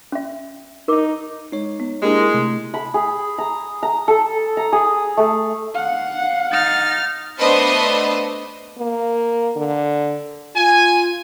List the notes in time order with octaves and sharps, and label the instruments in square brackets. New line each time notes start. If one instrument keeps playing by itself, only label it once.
[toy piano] C#4 E5
[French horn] D#4 [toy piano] A#4 D6
[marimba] G#3 [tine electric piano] D#4 C#5
[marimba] B3
[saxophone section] G#3 [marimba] A#3 D4 E4 [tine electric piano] G4 A#4
[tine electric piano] C3 A3
[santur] B5
G#4
A#5
A#5
A4
A#5
G#4
A3
[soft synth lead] F5 [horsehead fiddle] F#5
[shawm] D#4 [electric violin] F6 A6
[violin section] A3 B3 D4 B4 C5 D#5
[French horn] A#3
D3
[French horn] F4 [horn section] G#5